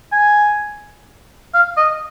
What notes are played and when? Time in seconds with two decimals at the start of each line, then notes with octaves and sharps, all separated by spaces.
0.12 G#5
1.54 F5
1.77 D#5